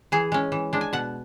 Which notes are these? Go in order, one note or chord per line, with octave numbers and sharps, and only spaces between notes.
E3 G#4
G#3 C#4
E3
G#3 D4
G#5
B2 F#5